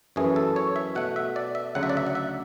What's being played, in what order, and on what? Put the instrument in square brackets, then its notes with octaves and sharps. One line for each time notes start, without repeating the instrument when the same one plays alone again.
[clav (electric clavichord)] F#2 E3 A3 G#4
A4
C#5
E5
B2 A3 F#5
E5
D5
E5
D2 C#3 F#3 F#5
E5
D5
E5
F#5
E5